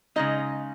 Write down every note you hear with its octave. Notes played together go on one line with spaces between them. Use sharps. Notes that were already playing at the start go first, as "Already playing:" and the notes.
C#3 G#3 D#4 D#5